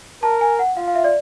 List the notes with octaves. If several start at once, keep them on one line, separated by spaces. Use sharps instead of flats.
A#4 A5
G#5
F#5
F4 F5
F5
E5
D5